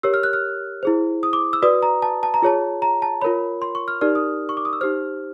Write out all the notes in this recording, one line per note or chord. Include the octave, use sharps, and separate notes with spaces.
G4 A#4 C#5 E6
F6
F#6
F6
E4 G#4 C5
D#6
D6
E6
F#4 B4 D5 D#6
A#5
A5
A5
A#5
F4 G#4 C#5 A5
A#5
A5
F4 A#4 C#5 B5
C6
C#6
F6
D#4 G4 A#4 D5 F6
D#6
C#6
D6
D#6
E6
D#4 G4 C5 F6